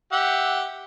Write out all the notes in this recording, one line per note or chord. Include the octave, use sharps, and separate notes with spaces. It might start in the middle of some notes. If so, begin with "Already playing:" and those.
G4 E5 F#5